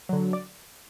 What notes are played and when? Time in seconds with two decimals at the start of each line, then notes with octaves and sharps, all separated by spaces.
0.09 D3 F#3
0.33 D5